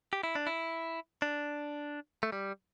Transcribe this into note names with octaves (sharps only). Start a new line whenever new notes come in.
G4
E4
D4
E4
D4
A3
G3